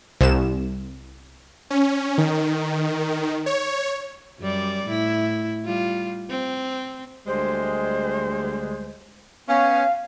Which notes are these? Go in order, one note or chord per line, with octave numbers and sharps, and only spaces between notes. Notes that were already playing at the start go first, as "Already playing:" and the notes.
C2 E7
C#4
D#3
C#5
F#2 G3 D5
A2 E4
G3 F4
C4
D2 G3 G#3 C5
B3 C#4 F5